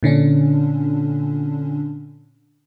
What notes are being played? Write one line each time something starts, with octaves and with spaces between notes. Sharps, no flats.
A#2 D3 C#4 D4